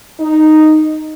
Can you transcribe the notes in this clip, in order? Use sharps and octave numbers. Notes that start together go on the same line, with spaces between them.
D#4